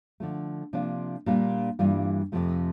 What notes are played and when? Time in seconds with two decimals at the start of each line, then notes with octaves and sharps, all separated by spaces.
0.20 D3 F3 A3
0.73 C3 F3 A#3 D4 F4
1.26 A#2 G3 A#3 D4 F4
1.79 G2 E3 G3 A#3 F4
2.32 F2 C3 F3 A3